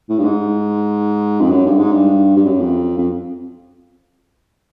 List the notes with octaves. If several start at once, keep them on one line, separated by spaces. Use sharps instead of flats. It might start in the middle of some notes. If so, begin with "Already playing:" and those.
A2
G2
G#2
F2
F#2
G2
G#2
G2
G2
F#2
F2
F2